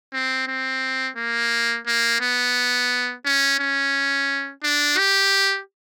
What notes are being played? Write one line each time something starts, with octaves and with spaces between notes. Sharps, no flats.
C4
C4
A#3
A#3
B3
C#4
C#4
D4
G4